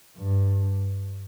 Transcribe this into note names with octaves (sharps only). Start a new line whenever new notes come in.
G2